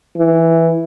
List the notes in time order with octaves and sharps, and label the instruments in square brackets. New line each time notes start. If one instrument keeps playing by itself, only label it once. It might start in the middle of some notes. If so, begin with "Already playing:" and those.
[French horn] E3